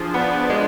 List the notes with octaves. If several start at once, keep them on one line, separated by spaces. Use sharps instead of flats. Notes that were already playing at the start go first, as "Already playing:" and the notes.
Already playing: F3 D4 F4 G#4 C5
B3 B4 D5
G#3